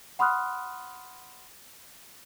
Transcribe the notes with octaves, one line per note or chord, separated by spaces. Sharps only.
F#5 B5 C6 D#6 F6 F#6